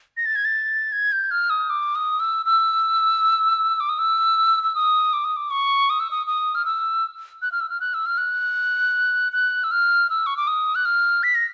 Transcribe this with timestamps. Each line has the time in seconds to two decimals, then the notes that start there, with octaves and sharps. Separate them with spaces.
0.17 A#6
0.26 A6
0.36 G#6
0.45 A6
0.92 G#6
1.12 G6
1.31 F6
1.50 D#6
1.70 D6
1.95 D#6
2.20 E6
2.46 E6
3.80 D6
3.89 D#6
3.99 E6
4.63 E6
4.75 D#6
5.13 D6
5.24 D#6
5.36 D6
5.51 C#6
5.90 D#6
6.00 E6
6.11 D#6
6.27 D#6
6.55 F6
6.65 E6
7.42 F#6
7.52 F6
7.60 E6
7.70 F6
7.80 F#6
7.94 E6
8.06 F6
8.18 F#6
9.33 F#6
9.64 E6
9.71 F6
10.10 E6
10.26 C#6
10.37 D6
10.47 D#6
10.75 F#6
10.85 F6
11.23 B6
11.35 A#6